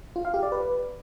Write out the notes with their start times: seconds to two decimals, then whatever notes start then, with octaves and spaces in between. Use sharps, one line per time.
0.16 F4
0.25 F5
0.34 G4
0.43 D5
0.52 B4